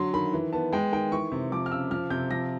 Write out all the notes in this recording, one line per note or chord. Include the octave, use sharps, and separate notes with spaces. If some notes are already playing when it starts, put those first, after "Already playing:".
Already playing: D3 F#3 C6
D#3 B5
E3
B3 A5
G#3 G5
D#3 G5
E3 C#6
C3
F3 D6
F6
C#3 E6
F3 F6
C3 G6
F3 A#6